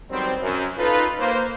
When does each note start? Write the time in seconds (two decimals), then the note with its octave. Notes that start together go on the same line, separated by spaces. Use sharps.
0.10 D#3 F#3 G3 B3 C4
0.41 F#2
0.78 D#4 F4 A4 B4
1.19 A#3 C5